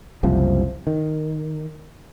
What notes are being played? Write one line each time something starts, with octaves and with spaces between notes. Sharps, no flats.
F#1 C2 C3 F3
D#3